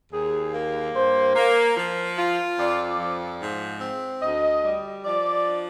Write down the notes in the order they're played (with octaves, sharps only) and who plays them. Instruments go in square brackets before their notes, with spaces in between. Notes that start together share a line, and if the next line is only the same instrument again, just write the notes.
[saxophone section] D#2 [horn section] G#4
[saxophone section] A#3
[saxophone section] G2 [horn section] C5
[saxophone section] A#3
F3
F4
[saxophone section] F2 [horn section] D5
[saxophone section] F3
G#2
C4
[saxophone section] D2 [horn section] D#5
[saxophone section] G3
[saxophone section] F3 [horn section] D5
[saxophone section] D4